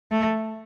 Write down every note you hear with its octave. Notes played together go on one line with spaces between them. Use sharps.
A3